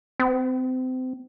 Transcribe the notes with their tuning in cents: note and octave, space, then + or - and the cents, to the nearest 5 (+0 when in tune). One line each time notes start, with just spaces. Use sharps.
C4 -30